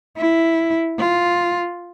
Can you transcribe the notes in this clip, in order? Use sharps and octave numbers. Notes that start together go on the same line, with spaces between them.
E4
F4